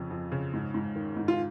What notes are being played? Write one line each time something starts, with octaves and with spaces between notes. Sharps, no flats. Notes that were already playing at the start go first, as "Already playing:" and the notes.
Already playing: F2 C#3
F2
C#3
G#2
G#2
D#3
G#2
F4